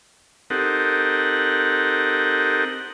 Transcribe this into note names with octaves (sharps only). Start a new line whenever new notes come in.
C4 D#4 G4 A4 A#4 F#5